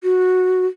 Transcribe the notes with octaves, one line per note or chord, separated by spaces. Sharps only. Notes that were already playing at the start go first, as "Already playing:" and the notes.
F#4